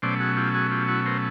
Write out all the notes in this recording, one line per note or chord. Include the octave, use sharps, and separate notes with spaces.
B2 F#3 A3 C#4 C5 D5
F#4 G#4
F4 G4
F#4 G#4
F4 G4
E4 F#4
A#4 C5